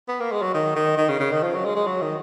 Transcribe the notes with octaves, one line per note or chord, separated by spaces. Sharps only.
B3
A#3
G#3
F#3
D#3
D#3
D#3
C#3
C#3
D#3
F3
F#3
G#3
G#3
F#3
D#3